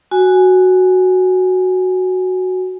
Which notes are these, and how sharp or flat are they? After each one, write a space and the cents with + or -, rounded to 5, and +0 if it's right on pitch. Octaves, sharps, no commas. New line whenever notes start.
F#4 +0 G#5 +0